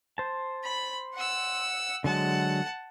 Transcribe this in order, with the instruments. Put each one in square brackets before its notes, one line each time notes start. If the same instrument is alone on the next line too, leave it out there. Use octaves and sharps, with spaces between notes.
[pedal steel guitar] C5 A5
[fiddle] B5
F#5 E6
[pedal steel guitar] D3 F#3 G#3 [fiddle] F#5 A5